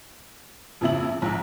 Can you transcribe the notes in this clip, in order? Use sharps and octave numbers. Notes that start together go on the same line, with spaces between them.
F2 A#2 C#3 E4 F#7
A#1 G#2